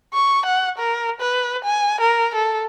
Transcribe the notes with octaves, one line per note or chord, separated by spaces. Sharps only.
C#6
F#5
A#4
B4
G#5
A#4
A4